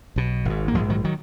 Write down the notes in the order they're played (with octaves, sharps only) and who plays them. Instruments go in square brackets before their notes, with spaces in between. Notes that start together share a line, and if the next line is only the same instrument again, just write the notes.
[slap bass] B1 B2
G#1 G#2
A#3
A#1 G#2 F3 G#3
D#3 F#3
D#3 F#3